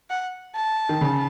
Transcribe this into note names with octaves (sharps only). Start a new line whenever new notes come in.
F#5
A5
D#3
C#3